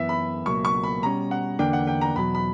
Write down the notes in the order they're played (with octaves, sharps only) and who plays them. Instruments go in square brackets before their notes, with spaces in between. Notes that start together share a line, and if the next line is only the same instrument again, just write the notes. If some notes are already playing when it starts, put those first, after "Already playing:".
Already playing: [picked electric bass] F#2 E3 B3 [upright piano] E5
[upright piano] B5
[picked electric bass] C#2 B2 F#3 A#3 [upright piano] C#6
[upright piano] C#6
B5
[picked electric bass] B2 G3 C#4 [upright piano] A#5
[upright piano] F#5
[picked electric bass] E2 D3 A#3 D4 [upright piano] G5
[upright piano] F#5
G5
A#5
[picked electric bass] E2 B2 F#3 [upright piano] B5
[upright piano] B5